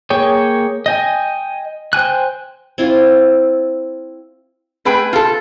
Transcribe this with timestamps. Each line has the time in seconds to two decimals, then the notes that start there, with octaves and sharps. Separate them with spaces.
0.10 A#3 G#4 C#5 G5
0.86 D#5 G5 G#5
1.93 C5 G5 G#5 F#6
2.78 C4 E4 F4
4.85 A3 G#4 B4 G5
5.13 F4 A4